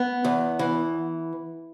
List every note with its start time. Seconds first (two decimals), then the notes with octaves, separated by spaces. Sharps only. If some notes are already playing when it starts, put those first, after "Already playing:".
Already playing: B3
0.25 E2
0.59 E3